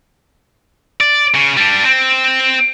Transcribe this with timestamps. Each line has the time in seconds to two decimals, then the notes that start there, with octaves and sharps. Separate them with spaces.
1.01 D5
1.34 C#3
1.57 G3 D4
1.85 C4